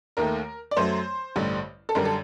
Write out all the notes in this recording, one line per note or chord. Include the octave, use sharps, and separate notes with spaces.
D#2 D#3 A3 A#4
D5
F#2 F#3 A3 C5
A1 G2 D3 G3
A4
F#2 D3 G3 A#4
A4